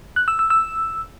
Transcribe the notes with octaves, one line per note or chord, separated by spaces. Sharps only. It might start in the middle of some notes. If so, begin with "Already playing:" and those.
F#6
E6
E6
E6